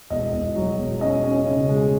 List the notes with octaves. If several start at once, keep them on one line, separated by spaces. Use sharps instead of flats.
E1 D#5
E1
F#3
E1
C#4 D#5
C#4
C#3
G#3